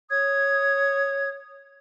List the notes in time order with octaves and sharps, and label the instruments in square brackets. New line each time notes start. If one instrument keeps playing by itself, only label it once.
[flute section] C#5 D#6 G#6